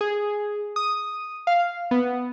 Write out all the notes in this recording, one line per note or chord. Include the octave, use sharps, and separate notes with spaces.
G#4
D#6
F5
B3